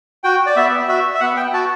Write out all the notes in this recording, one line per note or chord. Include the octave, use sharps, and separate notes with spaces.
F#4 G5
D5
B3 E5
F#4 E5
E5
B3 F#5
G5
F#4 A5